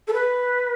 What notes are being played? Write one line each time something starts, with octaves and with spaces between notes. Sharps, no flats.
A4
B4